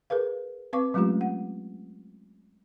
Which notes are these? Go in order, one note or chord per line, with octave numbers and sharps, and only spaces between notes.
G#4 A#4 B4 F5
C4 B4 F5 C#6 D6
F#3 G#3 A3 C#4 F4 G4
F#5